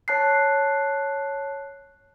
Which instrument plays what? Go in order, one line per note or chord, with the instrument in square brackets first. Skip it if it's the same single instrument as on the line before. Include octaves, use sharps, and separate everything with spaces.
[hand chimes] C#5 A5 F#6 C7